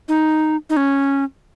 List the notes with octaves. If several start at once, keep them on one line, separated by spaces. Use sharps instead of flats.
D#4
D#4
C#4